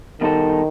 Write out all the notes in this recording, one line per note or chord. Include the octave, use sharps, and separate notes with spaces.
B2 D#3 G3 D#4 A4 C5